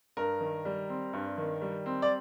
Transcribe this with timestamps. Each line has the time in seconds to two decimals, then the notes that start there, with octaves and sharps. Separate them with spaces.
0.17 G2 A#4
0.41 D#3
0.65 G3
0.89 C4
1.13 G2
1.38 D#3
1.62 G3
1.86 C4
2.02 D5